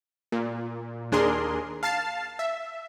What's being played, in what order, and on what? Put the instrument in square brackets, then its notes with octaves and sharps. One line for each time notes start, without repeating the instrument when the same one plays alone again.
[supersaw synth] A#2
D#2 D4 G#4 A#4 C6
F5 A5 A6 C7
E5